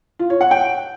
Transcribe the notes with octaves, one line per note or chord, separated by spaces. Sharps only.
F4
C#5
F#5
G5